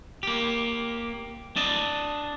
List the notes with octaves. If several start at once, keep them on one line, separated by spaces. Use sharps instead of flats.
A#3 G4
D4 D5 D#5